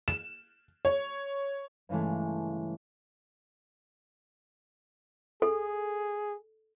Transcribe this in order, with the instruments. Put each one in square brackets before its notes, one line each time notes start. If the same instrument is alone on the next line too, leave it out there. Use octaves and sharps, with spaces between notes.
[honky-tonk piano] E7
C#5
[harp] G2 C#3 E3 G#3 A3
[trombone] G#4 [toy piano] A4